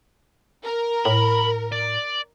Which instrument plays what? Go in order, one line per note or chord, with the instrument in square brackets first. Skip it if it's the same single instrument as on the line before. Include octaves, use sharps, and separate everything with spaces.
[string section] A#4
[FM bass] A2 [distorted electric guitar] B5
[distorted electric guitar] D5